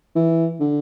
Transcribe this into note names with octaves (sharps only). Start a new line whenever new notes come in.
E3
D3